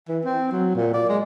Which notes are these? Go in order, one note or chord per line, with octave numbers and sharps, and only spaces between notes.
E3
C4
F#3
A#2
D5
G#3